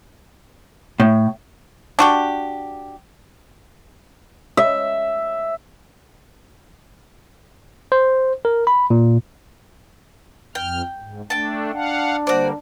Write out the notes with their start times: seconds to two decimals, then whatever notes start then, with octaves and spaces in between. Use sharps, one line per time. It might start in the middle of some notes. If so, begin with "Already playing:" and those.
1.00 A2
1.99 D4 F#4 G4
4.57 E5
7.92 C5
8.45 A#4
8.67 B5
8.90 A#2
10.55 F2 G5 F6
10.97 G#2
11.30 A3 D4 G5 A5
11.74 D4 F5 F#5
12.27 D3 G3 A#3 F#4 C5 D5